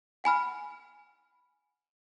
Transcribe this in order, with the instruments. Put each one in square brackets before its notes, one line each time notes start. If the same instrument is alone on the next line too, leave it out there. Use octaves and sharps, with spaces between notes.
[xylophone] F#5 G#5 B5 F6